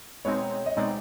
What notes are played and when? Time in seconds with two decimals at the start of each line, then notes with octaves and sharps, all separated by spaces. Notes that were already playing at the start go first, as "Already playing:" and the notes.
0.25 B2 G#3 C4 D#4 C#5
0.66 D#5
0.77 B2 G#3 C4 D#4 D5